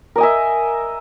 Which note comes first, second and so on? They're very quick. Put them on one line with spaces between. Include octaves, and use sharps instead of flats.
A#4 D#5 G#5 E5